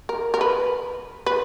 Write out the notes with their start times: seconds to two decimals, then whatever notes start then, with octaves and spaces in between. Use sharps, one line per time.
0.09 A#4
0.34 A#4
0.41 B4
1.26 B4